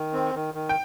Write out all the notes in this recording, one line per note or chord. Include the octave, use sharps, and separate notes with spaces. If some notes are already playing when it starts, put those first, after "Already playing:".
Already playing: D#3
C4
D#3
D#3
G5